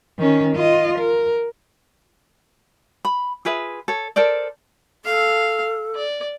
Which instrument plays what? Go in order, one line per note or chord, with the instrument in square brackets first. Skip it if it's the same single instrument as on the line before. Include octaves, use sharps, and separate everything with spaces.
[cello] D#3 C#4
F4 D#5
A#4
[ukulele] B5
F4 G#4 B4 E5
A4 C#5
A4 A#4 C5 D5
[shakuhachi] A4 [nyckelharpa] F5
[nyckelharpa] D5